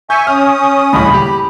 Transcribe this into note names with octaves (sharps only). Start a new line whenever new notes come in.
E5 G#5 C#6 G6
C#4 D#6 F6
D#1 C#2 A2 B5
G4